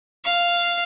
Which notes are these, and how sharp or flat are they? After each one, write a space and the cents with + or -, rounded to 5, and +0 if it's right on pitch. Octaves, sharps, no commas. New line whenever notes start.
F5 -5